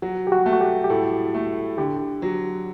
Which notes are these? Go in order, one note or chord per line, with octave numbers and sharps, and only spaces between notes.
F#3 F#4
G4
F#4
A3
F#4
G4
G4
A2 A4
A3
D3 G4
F#3